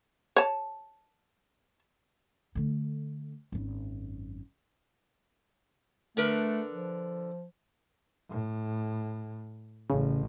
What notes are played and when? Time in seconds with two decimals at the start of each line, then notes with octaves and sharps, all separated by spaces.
0.36 C#5 A5
2.55 D3 A3
3.52 G#1 F#2
6.17 D3 A3 A#4 B4
6.73 F3
8.29 A2
9.90 A1 C#3